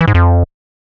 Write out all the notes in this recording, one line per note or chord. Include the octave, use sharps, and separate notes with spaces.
E3
G#2
F2